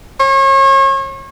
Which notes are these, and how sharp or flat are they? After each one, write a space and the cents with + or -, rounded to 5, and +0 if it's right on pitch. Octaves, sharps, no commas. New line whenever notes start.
C#5 -35